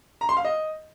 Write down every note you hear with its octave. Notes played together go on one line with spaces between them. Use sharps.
A#5
C6
F5
D#5